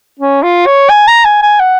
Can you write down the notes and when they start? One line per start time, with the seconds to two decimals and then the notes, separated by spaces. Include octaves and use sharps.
0.19 C#4
0.43 F4
0.66 C#5
0.90 G#5
1.08 A#5
1.25 G#5
1.42 G#5
1.60 F#5